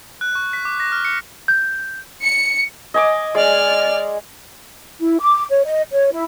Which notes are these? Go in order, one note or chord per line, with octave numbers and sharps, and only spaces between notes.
F#6
C#6
B6
D6
A#6
F6
C#7
G6
C#7
D#5 G#5 D6
G#3 D5 G#5 F6
E4
D6
C#5
D#5
C#5
E4